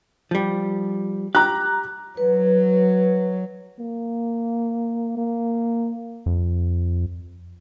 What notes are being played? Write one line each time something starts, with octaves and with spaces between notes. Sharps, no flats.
F3 G3
G4 A#5 F#6
F#3 B4
A#3
A#3
F2